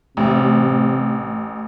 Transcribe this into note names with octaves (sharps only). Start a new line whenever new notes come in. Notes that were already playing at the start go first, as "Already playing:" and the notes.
A1 C3